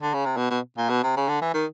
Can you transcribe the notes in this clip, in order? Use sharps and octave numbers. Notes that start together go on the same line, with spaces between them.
D3
C#3
C3
B2
B2
A#2
B2
C3
C#3
D3
E3
D#3